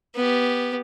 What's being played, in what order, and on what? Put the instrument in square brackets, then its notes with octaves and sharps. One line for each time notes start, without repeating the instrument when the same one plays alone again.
[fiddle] B3 G4